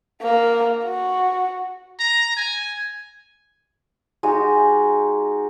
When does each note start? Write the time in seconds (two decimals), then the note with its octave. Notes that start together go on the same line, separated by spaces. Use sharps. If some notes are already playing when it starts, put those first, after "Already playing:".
0.21 A#3
0.85 F#4
2.00 A#5
2.37 G#5
4.23 G#3 D#4 F#4 G4